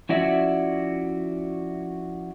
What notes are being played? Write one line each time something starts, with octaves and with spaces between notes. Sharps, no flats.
F3 C#4 E4 F#4 D5 E5